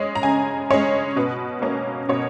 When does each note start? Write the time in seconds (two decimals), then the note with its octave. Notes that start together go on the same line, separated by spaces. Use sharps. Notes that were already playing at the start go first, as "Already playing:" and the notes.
Already playing: G#3 C#4
0.15 A#5
0.23 C#3 G#5
0.71 G#3 C#4 C#5
1.16 B2 B4
1.62 A#3 C#4
2.09 B2 C#5